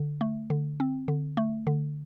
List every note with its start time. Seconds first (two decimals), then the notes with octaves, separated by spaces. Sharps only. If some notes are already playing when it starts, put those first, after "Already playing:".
Already playing: D3
0.21 A3
0.50 D3
0.80 C4
1.08 D3
1.37 A3
1.67 D3